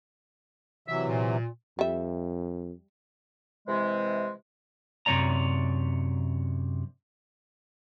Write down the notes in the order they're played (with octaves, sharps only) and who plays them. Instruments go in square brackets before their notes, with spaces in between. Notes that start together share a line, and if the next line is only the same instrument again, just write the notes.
[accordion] C3 E3 F#3 [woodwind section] E5
[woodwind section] A#2
[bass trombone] F2 [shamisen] G3 E5
[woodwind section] C3 E3 G#3
[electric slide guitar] F#2 C3 B3 C#5 D5 A#5